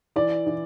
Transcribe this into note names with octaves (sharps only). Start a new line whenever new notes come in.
E3 D5
E3